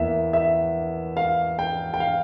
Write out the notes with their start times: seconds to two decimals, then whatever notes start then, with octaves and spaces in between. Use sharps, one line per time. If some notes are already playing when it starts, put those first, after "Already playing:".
Already playing: E2 E3 A#3 E5
0.33 E5
1.17 F5
1.59 G5
1.94 G5
2.00 F5